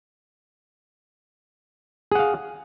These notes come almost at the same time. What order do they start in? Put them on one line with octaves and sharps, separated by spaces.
G#4 F#5 F5